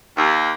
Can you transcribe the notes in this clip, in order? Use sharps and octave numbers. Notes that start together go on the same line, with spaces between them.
D#2